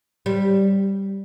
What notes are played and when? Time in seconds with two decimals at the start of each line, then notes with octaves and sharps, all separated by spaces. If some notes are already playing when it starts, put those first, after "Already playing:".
0.26 G3